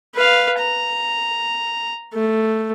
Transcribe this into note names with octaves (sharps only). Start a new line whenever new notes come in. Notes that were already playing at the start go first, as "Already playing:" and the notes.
B4 F5
A#5
A3